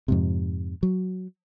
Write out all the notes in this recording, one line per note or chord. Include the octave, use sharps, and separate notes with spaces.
F2 G#2 C3
F#3